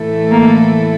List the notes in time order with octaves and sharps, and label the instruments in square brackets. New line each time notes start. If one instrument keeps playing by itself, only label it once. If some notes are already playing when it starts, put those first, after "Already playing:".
Already playing: [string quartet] A2 E3 A3 E4 A4
[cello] A#3